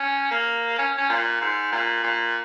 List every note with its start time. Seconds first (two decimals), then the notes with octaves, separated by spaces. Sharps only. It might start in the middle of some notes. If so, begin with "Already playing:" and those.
Already playing: C#4
0.31 A#3
0.78 C#4
0.97 C#4
1.09 A#2
1.41 G#2
1.72 A#2
2.03 A#2